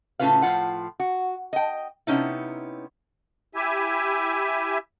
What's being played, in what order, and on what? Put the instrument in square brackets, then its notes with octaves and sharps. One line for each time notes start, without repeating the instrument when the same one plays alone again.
[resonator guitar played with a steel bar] A2 C#3 C#4 F4 B4 F5
A2 F3 F4 F#5
F#4
D#5 G5
C3 B3 C#4 D#4 E4
[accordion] E4 G4 E5 G#5